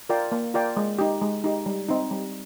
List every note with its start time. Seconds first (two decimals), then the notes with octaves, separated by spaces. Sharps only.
0.09 F4 A#4 D5 G5
0.32 A#3
0.54 F4 A#4 D5 G5
0.77 G#3
0.99 D#4 G4
1.21 G#3
1.44 D#4 G4
1.66 G3
1.89 C4 D#4
2.11 G3